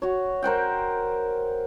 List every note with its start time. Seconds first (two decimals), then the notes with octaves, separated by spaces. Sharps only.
0.02 F#4 C#5
0.42 A#4 C5 F#5 G5